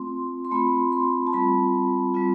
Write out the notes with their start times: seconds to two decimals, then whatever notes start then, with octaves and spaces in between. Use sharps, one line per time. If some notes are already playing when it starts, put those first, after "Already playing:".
Already playing: A3 C4 F4 C6
0.45 C6
0.51 A3 C4 F4 B5
0.92 C6
1.27 A5
1.33 G3 C4 F4 B5
2.14 G3 C4 F4